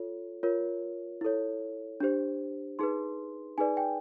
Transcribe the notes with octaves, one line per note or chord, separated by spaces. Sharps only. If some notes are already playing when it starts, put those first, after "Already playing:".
Already playing: F4 A4 C#5
F4 A#4 C#5
E4 A4 C#5
D4 G4 C5
D#4 G#4 B4 C6
D#4 G#4 B4 D5 G#5
G5